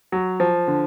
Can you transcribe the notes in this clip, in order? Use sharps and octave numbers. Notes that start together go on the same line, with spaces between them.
F#3
F3
D3